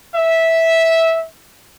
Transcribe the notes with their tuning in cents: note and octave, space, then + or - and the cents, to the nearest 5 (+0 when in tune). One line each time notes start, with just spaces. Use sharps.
E5 -10